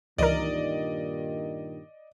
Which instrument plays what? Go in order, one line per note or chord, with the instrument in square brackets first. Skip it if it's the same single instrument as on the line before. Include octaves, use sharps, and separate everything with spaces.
[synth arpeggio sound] C#2 E3 A#4 [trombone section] G2 A#2 D#3 [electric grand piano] D5 D#5